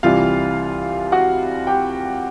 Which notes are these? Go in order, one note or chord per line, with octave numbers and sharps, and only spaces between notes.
C2 C3 E3 G3 F4 F5
F#4 F#5
G4 G5